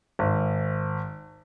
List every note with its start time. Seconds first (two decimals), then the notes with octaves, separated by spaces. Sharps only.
0.19 G#1